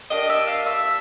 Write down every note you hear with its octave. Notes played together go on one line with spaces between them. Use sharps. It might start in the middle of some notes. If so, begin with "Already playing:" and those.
A#3 D4 G4 D#5
E5
F5
E5